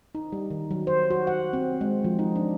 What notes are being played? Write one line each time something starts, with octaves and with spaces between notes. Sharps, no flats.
D#4
G3
D#3
F#3
C5
F#4
F#5
C4
G#3
F3
D#4
D4